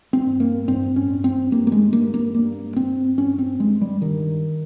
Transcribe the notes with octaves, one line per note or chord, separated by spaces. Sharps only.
C4
G2
A#3
G2 C4
C#4
G2
C4
G2 A#3
A#3
G#3
G2 A#3
A#3
G2 A#3
G2 C4
G2 C#4
C4
G2 G#3
G3
G2 D#3